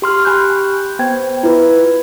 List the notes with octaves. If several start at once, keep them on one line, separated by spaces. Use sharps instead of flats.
G4 C6 F6
G4 G#5 B5 F#6 G6
B3 C5 G5 G#6
E4 F4 B4